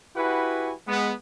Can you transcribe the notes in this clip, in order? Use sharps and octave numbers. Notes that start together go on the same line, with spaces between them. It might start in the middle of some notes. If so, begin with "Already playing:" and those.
E4 F#4 G4 B4 F#5 G#5
G#3 B3